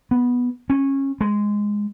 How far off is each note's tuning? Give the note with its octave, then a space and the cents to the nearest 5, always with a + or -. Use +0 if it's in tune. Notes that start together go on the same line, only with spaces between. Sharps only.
B3 -10
C#4 -20
G#3 -5